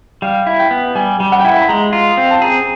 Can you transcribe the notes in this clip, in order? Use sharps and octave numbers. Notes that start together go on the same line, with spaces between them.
G3 F5
E4
G5
B3
G3 G#5
G3
F#5
G5
E4 F#5
B5
G#3 A#5
F4
C4
A5
G#4 A#5